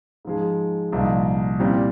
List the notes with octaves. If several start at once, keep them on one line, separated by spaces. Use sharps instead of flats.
G#2 F3 G#3
C2 A#2 F3 A#3 D#4
A#2 G3 C4 E4